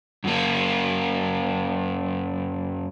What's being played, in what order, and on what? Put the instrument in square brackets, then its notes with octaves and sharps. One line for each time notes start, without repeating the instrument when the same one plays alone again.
[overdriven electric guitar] F#2 A#3